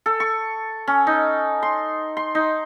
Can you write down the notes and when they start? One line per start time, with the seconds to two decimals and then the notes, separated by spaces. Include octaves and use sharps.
0.06 A4
0.20 C#6
0.87 C#4
1.07 D#4
1.63 C6
2.17 C6
2.35 D#4